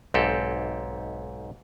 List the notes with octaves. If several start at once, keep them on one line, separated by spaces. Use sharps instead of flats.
B1 G#2 C4 G4 A4